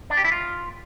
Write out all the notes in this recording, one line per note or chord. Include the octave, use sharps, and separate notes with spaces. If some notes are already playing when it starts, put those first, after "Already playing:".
D4
G4
E4
F4